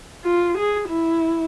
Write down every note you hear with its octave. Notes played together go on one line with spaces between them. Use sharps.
F4
G#4
E4